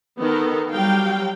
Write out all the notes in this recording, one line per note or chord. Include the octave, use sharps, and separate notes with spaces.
D#3 B3 A4 A#4
F#3 G3 F5 G5